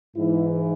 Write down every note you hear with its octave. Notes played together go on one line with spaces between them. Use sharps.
G#2 E3 E4